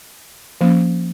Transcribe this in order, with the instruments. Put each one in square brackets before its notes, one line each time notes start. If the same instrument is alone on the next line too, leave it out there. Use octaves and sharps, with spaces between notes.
[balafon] F3 A#3 C#4